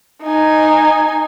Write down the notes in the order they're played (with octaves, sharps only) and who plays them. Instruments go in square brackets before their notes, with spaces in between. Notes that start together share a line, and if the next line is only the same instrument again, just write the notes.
[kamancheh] D#4 G#5